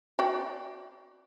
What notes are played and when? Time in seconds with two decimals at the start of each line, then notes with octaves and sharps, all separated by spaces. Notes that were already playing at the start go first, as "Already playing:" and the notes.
0.19 F#4 D5 G5